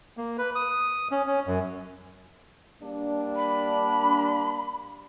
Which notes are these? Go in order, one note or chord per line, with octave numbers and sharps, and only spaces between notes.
A#3
B4
D#6
C#4
C#4
F#2
G3 A#3 D4
B5